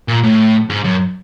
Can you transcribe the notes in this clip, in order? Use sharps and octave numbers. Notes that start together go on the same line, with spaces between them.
A#2
A2
G#2
F#2